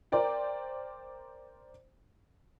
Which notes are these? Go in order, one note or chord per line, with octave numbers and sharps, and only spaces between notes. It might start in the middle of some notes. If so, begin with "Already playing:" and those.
A#4 C5 D5 G5